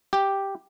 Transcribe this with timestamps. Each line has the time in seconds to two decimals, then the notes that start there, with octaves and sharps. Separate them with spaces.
0.13 G4